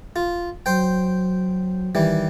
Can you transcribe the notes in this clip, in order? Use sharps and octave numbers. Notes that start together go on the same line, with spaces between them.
F4
F#3 C5 G5
D#3 E3 G3